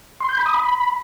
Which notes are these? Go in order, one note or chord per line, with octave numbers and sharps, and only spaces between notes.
C6
G6
B5
D#6
B5